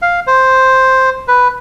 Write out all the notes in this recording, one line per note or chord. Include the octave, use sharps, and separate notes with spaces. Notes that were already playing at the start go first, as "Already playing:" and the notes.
F5
C5
B4